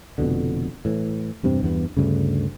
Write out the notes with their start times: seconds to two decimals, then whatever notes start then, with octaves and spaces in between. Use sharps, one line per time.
0.18 F1 F2 B2 D3
0.85 A2 E3
1.43 E2 G2 C3 C4
1.63 E2 G2 B3
1.97 D2 G2 C#3